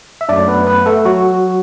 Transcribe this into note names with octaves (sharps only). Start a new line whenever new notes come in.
E5
F#2 F#3 A3 D4 D5
B3 B4
B3 B4
A3 A4
F#3 F#4